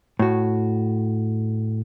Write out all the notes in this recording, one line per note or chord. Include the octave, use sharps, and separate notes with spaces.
A2 F#4